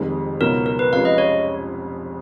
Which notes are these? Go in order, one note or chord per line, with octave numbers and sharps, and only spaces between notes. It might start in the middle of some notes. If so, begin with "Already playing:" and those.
Already playing: F1 F2 D#3 G#3
C#2 B2 F#3 B3 D#4 A#4
A#4
B4
F1 F2 F3 G#3 C#4 F5
D#5
C#5